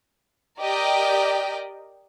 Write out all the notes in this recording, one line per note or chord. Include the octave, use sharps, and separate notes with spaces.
G4 A#4 D5 D#5 G5